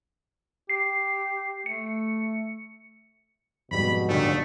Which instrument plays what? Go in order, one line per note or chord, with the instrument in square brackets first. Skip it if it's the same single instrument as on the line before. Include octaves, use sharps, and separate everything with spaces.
[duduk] G4 [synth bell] C7
[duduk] A3 [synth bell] C#7
[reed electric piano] F2 G#2 G3 [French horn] B2 [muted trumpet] B5
[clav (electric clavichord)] G1 A#2 D#3 [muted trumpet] A3